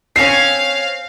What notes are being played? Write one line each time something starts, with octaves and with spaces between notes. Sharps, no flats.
C4 C#4 F5 C7